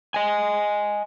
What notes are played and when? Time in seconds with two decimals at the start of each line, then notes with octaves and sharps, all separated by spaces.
0.14 D#5 G#5